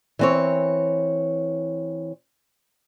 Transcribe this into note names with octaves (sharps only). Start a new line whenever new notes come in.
E3 C4 C#5